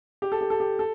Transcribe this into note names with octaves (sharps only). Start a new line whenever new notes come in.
G4
A4
G4
A4
G4
A4